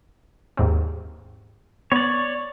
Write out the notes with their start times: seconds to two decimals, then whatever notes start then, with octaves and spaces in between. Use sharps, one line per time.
0.57 D#2 G#2 C4
1.92 B3 C#5 D5